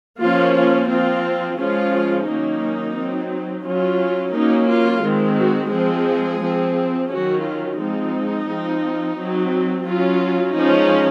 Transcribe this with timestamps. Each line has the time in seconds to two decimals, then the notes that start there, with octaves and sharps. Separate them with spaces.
0.19 F3 A#3 C#4 F4
0.53 F4
0.88 F3 C4 F4
1.57 F3 G#3 C#4 F4
2.26 D#3 F#3 A#3 C#4 D#4
2.95 F#3 C4
3.64 F#3 C#4 F4
4.33 F#3 A#3 C#4 D#4
4.68 F4
5.03 D#3 G#3 C4
5.36 F#4
5.71 F3 G#3 C4 G#4
6.40 F3 C4
7.10 D#3 F#3 C#4 F#4
7.44 F4
7.79 F3 G#3 C4 D#4
8.47 F3 C4
9.17 F#3 C4
9.86 F#3 C#4 F4
10.54 F3 G#3 C#4 D#4